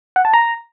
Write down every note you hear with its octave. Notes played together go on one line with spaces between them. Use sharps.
F#5
A5
A#5